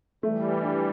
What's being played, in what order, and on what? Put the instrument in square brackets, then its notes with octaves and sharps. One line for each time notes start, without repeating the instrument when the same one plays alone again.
[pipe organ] E3 G3 [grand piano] A3
[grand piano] D4